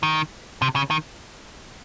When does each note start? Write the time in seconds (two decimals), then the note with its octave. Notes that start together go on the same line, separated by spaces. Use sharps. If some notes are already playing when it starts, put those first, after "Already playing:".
0.03 D#3
0.62 C3
0.76 C#3
0.91 D#3